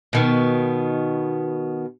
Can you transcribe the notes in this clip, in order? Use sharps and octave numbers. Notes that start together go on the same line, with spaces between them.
B2 D#3 B3